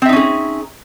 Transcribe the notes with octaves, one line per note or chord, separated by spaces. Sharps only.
C4 C#4 D#4 G#4 E5